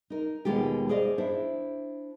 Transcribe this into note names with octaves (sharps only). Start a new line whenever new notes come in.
D#4 A#4
D#2 B2 G#3 F4 G4
G#4 C5 D5 D#5 F5
D4 E4 C5